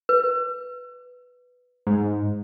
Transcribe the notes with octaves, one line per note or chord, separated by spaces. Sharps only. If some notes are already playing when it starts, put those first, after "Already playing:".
B4
G#2